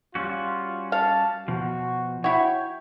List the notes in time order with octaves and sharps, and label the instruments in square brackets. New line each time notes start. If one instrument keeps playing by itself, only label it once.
[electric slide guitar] G3 C#4 F#4 [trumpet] F4
[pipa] F5 [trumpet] A5
[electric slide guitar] B2 F3 [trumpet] F#4
[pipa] E4 F#4 [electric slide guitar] C#5 [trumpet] G5